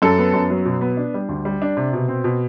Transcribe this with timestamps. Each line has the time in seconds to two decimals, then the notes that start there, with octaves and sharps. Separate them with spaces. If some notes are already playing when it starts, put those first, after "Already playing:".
0.02 F#2 A4
0.18 B3
0.34 F#2
0.50 F#3
0.65 B2
0.81 B3
0.97 D4
1.14 G3
1.29 D2
1.45 G3
1.62 D4
1.77 C3
1.93 B2
2.08 C4
2.24 B2